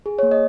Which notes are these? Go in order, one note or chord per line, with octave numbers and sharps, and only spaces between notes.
G#4
A#3 C#5
D#5